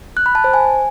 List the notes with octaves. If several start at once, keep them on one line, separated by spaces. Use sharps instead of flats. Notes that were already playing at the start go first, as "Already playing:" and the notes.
F#6
B5
A5
C5
G#5